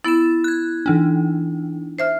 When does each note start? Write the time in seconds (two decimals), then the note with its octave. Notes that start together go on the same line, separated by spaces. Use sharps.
0.05 B3 E4 A6 E7
0.44 F#6 G#6
0.86 E3 D4 D#4
1.98 C5 E5 F6